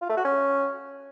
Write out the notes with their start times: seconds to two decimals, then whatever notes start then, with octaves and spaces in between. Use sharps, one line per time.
0.01 F4
0.09 A3
0.17 F#4
0.25 C#4